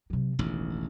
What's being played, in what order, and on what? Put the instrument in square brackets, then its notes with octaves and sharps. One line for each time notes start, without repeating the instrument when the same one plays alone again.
[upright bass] C3 F#3
[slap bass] E1 A1 [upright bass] D#3